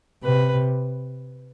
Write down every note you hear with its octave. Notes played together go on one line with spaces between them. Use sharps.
C3 B4